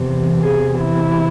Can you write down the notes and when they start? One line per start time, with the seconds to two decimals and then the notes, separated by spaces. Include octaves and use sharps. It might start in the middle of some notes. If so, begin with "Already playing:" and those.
Already playing: E2 C3 E3
0.41 G#4
0.81 E4